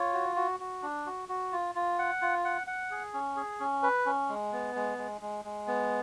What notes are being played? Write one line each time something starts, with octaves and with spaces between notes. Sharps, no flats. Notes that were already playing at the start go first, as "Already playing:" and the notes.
Already playing: F4 C#5
F#4
F#4
F#4
D4
F#4
F#4
F4
F4
F#5
F4
F#5
F#5
G#4
C#4
G#4
C#4
B4
C#4
G#3
B3
G#3
G#3
G#3
G#3
B3